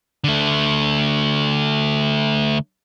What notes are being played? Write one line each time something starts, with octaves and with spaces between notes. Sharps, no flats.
D3 A3